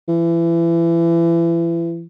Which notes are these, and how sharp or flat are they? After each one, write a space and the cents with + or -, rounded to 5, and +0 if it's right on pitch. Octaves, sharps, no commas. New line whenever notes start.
E3 +30